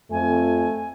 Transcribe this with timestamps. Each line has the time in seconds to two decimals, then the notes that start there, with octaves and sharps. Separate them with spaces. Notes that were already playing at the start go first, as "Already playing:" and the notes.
0.11 F2 A3 G#5